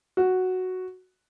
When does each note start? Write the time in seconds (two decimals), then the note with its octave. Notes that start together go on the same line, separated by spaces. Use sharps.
0.17 F#4